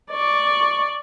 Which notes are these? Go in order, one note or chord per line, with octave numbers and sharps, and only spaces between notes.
D5 C#6